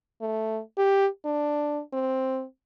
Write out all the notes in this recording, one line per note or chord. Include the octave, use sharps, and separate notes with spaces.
A3
G4
D4
C4